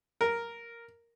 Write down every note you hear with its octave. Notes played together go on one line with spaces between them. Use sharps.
A#4